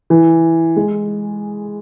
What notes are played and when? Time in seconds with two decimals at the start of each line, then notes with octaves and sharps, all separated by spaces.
0.10 E3
0.76 G#3